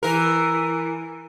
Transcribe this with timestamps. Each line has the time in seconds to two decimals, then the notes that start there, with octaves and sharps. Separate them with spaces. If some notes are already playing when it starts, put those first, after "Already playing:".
0.03 E3 A#4